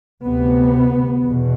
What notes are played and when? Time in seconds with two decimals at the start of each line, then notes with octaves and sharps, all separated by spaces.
0.24 D2 C3 B3
1.23 E2 B2